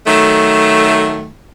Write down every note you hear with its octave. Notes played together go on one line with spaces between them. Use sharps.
D#3 F#3 A3